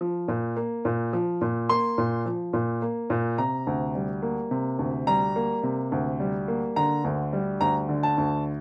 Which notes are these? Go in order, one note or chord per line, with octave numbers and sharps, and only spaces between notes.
F3
A#2
A#3
A#2
F3
A#2
A#3 C6
A#2
F3
A#2
A#3
A#2
C3 A#5
D2
G3
A#3
C3
D2
G3 A#5
A#3
C3
D2
G3
A#3
D3 A#5
D2
G3
D2 A#5
D3
A5
D2